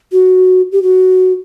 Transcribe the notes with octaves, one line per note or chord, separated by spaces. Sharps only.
F#4
G4
F#4